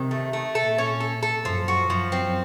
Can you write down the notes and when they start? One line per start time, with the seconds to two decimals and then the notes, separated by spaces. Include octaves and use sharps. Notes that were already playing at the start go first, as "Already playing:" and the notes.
Already playing: C3 D#3
0.11 A3
0.33 A3
0.55 A#2 A4
0.78 C#4
1.00 A4
1.23 A4
1.45 F#2 F3
1.68 F#4
1.90 F#2 F3
2.12 C4